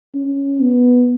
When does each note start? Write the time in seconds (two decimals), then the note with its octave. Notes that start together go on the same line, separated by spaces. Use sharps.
0.15 C#4
0.61 B3